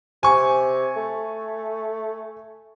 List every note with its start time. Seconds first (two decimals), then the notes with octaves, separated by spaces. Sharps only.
0.23 C3 G#5 C#6
0.96 A3